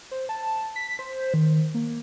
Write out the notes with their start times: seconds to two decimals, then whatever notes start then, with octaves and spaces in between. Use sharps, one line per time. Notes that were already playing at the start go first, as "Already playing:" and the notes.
0.11 C5
0.29 A5
0.76 B6
0.99 C5
1.34 D#3
1.74 A#3